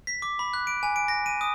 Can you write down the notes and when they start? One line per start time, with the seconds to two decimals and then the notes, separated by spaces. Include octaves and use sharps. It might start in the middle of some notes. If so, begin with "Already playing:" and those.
0.07 B6
0.22 D6
0.39 B5
0.54 F#6
0.67 D7
0.83 G#5
0.96 D7
1.08 A#6
1.26 D#7
1.41 D#6